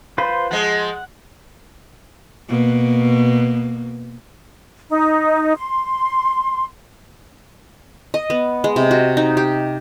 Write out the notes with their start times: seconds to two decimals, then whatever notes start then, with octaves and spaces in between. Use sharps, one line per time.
0.18 F4 B4 C5
0.51 F3 G#3 F#5
2.49 B2 A#3
4.90 D#4
5.56 C6
8.14 D#5
8.30 B3
8.64 G#3
8.76 C3
8.91 F#4
9.17 D#4
9.37 G4